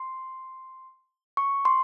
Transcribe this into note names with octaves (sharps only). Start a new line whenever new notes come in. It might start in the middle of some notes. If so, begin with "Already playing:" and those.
Already playing: C6
C#6
C6